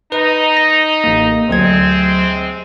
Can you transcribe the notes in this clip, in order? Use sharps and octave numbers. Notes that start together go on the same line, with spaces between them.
D#4 B4
A#6
A1 A#3
D2 C3 F#3 G#3 C4 G#6